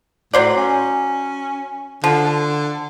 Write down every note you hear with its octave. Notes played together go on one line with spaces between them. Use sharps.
A2 F#3 C5 D5
C#4
D3 F3